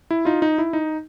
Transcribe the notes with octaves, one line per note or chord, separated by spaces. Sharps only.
E4
D#4 F4
D#4
E4
D#4